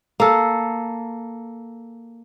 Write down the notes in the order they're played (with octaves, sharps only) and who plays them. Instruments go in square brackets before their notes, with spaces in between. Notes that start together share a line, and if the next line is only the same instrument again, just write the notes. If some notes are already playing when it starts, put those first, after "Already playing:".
[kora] A#3 A4